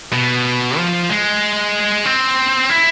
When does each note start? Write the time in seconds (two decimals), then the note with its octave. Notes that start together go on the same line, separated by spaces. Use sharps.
0.13 B2
0.77 F3
1.10 G#3
2.06 C4
2.70 E4